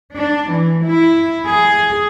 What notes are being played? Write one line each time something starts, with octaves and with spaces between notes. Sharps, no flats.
D4
E3
E4
G#4